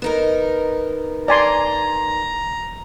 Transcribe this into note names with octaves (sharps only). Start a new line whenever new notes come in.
B3 D#4 A#4
D5 G#5 A#5 C6